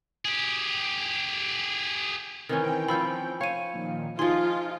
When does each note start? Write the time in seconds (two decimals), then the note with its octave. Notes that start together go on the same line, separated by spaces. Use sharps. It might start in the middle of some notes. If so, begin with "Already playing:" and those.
0.25 G4 G#4
2.49 D#3 E3 C4 C#4 G5
2.88 F3 C#4 B5 E6 G6
3.41 C#5 F5 D#7
3.73 A#2 D#3 F3
4.19 F3 D#4 F4 G#4 C6